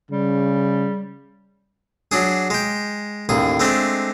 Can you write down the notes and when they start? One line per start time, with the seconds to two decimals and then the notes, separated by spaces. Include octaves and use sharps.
0.11 C#3 G3
2.12 F#3 D4 G#4
2.50 G#3 G5
3.29 A1 D#2 G#4
3.60 G#3 A3 C4 D4